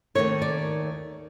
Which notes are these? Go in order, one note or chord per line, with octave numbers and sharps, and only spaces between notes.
D#2 D#3 F#3 A3 C#5
D5